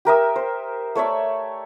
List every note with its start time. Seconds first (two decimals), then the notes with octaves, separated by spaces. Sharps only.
0.05 G4 A#4 E5 D#6
0.36 C5
0.95 A3 C#5 D5 E5